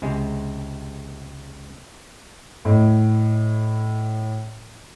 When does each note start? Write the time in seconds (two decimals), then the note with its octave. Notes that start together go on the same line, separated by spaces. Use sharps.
0.02 C#2 C3 G#3
2.65 A2 D#5